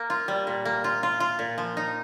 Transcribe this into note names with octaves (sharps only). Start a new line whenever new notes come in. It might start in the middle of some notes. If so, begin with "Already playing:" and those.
Already playing: A#3
F4
G3
A#2
A#3
F4
F4
F4
A#2
F3
D#4